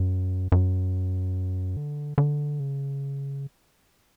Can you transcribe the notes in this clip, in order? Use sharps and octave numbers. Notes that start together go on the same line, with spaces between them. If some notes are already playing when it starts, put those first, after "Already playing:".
Already playing: F#2
F#2
D3
D3
C#3